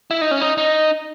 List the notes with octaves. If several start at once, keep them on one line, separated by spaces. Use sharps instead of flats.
E4
D#4
C#4
D#4
D#4